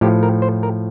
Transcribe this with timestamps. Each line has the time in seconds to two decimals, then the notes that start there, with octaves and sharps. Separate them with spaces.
0.01 A2 F3 G4
0.23 A#4
0.42 C5
0.63 A#4